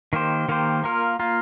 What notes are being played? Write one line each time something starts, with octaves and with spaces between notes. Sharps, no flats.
D#3 A#3 G4 C5
D#3 A#3 G4 C5
A#3 F4 A#4
A#3 F4 A#4